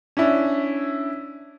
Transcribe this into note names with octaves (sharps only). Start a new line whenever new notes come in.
C#4 D4 E4